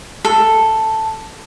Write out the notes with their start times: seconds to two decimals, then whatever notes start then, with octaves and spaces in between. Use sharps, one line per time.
0.25 A4